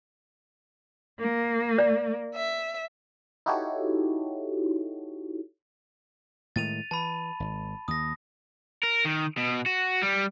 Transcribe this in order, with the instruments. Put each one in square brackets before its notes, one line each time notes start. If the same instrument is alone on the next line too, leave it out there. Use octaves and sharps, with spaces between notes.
[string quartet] A#3
[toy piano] D5
[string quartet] E5
[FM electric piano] D#4 E4 F#4 G4 A4 C#5
[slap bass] A2 D#3 G#3 [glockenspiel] A6 D#7 F7
[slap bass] E3 [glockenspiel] A5 B5
[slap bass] G#1
[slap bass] D#2 [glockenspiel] D#6 A#6
[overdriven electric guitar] A#4
D#3
B2
F#4
G3